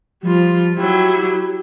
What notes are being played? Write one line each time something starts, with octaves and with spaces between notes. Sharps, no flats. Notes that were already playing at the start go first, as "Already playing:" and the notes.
F3 G3 F4
F#3 E4 G4